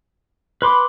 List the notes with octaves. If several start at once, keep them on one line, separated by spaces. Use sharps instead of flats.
B4 B5 C6 D6